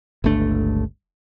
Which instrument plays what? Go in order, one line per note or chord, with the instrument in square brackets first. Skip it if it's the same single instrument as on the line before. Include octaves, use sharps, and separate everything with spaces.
[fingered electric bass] G1 C#2 A3 D4